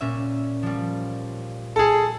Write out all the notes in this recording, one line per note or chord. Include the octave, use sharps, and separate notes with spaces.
A#2 C#4 E5
F3 G3
G#4 A4